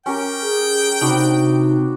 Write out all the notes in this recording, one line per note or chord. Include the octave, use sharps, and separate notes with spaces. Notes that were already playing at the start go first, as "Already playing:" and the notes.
C#4 G4 A#4 G5
G#4
C3 D4 D#4 F#4 B5